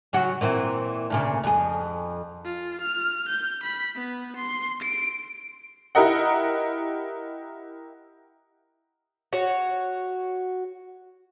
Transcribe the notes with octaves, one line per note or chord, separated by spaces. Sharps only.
C#3 F#3 F#4
A#2 E3 C4
D2 A#2 C#3
F2 G#4
F4
F6
G6
B5
B3
C6
D7
E4 G4 A#4 D#5 F#5
F#4 C#5